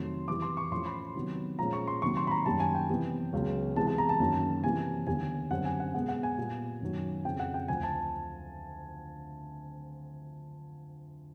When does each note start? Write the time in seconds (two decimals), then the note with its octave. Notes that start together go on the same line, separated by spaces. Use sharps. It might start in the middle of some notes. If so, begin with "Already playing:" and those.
Already playing: F2 C3 D#3 F#3 A3 C6
0.28 C3 E3 G3 D6
0.42 C6
0.57 C#6
0.71 A2 F3 A3 C#4 C6
0.86 B5
1.15 C3 D#3 F#3 B3
1.59 A#2 F3 G#3 C#4 A#5
1.73 C#6
1.87 C6
2.02 C3 D#3 F#3 A#3 C#6
2.17 C6
2.27 B5
2.31 A#5
2.46 F#2 D#3 G3 A#3 A5
2.60 G#5
2.75 G5
2.89 C3 E3 G3 B3
3.33 C#2 C#3 F#3 B3
3.76 C3 E3 G#3 B3 A5
3.87 A5
3.98 A#5
4.09 A5
4.20 F#2 D#3 F#3 A#3 C#4
4.64 C3 E3 G3 A#3 G#5
5.07 D#2 D3 G3 B3 G#5
5.51 F#2 D3 G3 C4 F#5
5.65 G#5
5.80 F#5
5.94 B2 G#3 B3 F#5
6.08 F#5
6.23 G#5
6.38 A#2 G3 B3
6.81 F#2 D#3 F#3
7.25 F2 C#3 F3 G5
7.39 F#5
7.54 G5
7.68 D2 D3 F3 G#5
7.83 A5